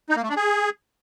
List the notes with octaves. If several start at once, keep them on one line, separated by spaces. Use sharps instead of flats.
D#4
A#3
A3
D4
G#4